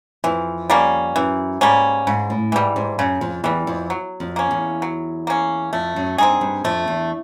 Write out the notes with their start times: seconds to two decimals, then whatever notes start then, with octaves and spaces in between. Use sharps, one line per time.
0.24 F2 E3
0.70 G3 A#3 C#4
1.16 F#2 E3
1.61 G#2 G3 A#3 C#4
2.07 G#2 C#3
2.30 A2
2.52 G#2 E3 G3
2.76 G#2
2.99 F#2 C#3
3.21 F2
3.44 E2 E3 G3
3.67 F2
3.90 F#3
4.20 F2
4.36 A#3 C#4
4.51 E2
4.82 F#3
5.27 A#3 C#4
5.73 F2 A3
5.96 F#2
6.18 G2 C4 D#4 G#4
6.41 G2
6.64 F2 A3
6.88 E2